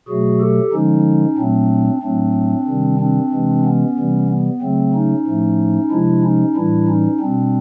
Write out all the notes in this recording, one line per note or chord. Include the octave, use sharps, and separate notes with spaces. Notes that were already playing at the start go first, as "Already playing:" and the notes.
B2 F#3 A3 F#4 G#4
G4 A4
D3 F3 G#3 C#4 D#4
A#2 F#3 A3 C4 D4
A2 F#3 A3 C4 D4
C3 D#3 G3
C4 D4
C3 E3 G#3
B3 C#4
C3 E3 G3
B3
C#3 F#3 A3 C4
C#4 D#4
A2 F3 A3
C3 F3 G#3 D4 E4
C#4 D#4
A2 E3 G3 D4 E4
C#4 D#4
B2 G3 C4 D4